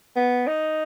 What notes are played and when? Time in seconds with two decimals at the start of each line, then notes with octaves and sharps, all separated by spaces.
0.16 B3
0.47 D#4